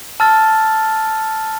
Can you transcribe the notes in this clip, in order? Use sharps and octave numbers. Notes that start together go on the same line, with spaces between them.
A5 E6 F6 A6